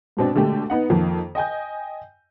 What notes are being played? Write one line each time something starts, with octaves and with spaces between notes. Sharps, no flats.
G#2 B2 C4 D4
B2 D3 G#3 A3 G4
B3 D#4 F#5
F2 D#3 F3 A#3
D#5 G5 G#5 G6